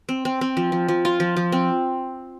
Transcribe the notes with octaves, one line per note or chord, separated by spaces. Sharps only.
C4
C4
C4
F3
F3
F3
F4
F3
F3
C4